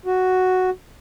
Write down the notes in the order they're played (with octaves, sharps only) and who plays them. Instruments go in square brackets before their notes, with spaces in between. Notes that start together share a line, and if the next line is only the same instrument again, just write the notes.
[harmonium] F#4